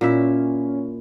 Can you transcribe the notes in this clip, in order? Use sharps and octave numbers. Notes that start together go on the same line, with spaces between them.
A#2 C#4 E4 E5